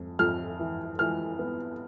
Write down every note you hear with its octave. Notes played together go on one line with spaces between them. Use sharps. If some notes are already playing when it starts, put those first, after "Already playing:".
Already playing: F2
F2 F6
E3
E3 F6
B3